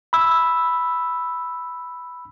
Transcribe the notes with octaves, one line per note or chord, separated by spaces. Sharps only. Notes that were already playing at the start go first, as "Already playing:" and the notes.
B5 E6